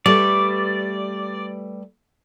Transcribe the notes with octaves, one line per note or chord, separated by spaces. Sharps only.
G3 A3 B4 D5